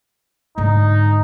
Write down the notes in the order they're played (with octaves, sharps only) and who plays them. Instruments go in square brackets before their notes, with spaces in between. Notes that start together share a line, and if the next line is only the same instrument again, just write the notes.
[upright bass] G#2 D3 [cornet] D#4